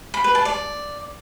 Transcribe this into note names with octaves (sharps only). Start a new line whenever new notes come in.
B5
B4
A5
D5